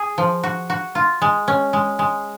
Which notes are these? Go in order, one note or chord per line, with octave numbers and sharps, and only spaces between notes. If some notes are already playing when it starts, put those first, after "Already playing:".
Already playing: G#4
F3
F#4
F#4
F4
G#3
C#4
G#3
G#3